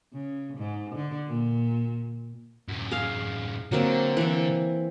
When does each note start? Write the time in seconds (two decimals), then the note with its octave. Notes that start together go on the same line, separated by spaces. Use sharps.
0.13 C#3
0.57 G#2
0.95 D3
1.28 A#2
2.69 F#2 A2
2.91 G#4 F5
3.72 D3 F#3 A#3 C4
4.17 E3 C4